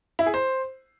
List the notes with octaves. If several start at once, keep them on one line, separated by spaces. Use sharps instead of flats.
E4
G#4
C5